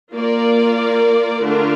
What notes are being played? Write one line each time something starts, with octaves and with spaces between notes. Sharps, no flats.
A#3 F4 A#4 D5
D3 A3 D4 F4 A#4